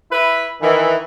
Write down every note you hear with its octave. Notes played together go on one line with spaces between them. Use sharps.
E4 B4 E5 B5
D#3 E3